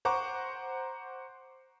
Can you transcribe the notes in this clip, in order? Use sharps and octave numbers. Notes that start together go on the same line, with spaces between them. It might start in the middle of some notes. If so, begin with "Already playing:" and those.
C5 F#5 A#5 C#6 D6